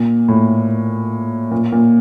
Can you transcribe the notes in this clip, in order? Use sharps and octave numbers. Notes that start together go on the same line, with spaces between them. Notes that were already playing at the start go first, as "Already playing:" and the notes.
Already playing: A#2
A2
A#2
A#2